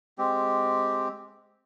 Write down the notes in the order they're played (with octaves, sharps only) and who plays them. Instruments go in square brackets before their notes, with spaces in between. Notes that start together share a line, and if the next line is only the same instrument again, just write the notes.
[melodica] G#3 C4 G4